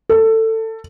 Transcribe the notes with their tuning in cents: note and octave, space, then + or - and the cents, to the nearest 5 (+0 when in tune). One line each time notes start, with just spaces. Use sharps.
A4 +20